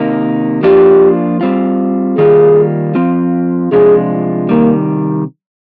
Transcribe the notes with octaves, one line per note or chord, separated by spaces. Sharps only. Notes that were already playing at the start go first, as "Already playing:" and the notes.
Already playing: C3 D#3 A#3 D#4
F3 A#3 D4 F4 G4
G3 C4 F4
D#3 G3 A#3 F4 G#4
F3 C4 F4
C3 F3 G#3 D4 F4 G#4
C3 D#3 G3 A#3